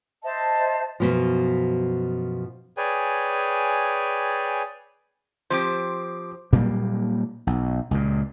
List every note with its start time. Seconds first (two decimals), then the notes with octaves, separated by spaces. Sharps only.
0.23 C5 D#5 E5 A5
1.00 F#2 B2 F3
2.77 G#4 B4 C#5 D5 G5 G#5
5.50 F3 C4 G4 C5 D6
6.53 A#2 F#3 G3 A#3
7.47 B1
7.91 C#2 A#2